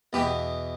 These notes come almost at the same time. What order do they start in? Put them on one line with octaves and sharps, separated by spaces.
E2 G4 B4 B2